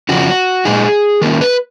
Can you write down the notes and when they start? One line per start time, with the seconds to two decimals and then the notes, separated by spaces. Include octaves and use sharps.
0.09 F2 C#3 F3 F#4
0.65 A#2 G#3 D#4 G#4
1.21 D#3 A#3 C#4 A#4
1.41 B4